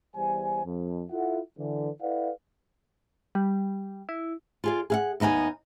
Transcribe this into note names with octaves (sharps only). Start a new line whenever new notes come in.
E2 G3 C5 G#5
F2
E4 F4 A4 E5 F#5
D3 E3
E4 A4 B4 D5 F5 F#5
G3
E4
F4 G#4 D5
G#4 F5 F#5
D#2 B3 D#4 F#5 G#5